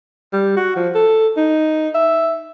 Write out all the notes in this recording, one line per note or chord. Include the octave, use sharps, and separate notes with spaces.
G3
F#4
F3
A4
D#4
E5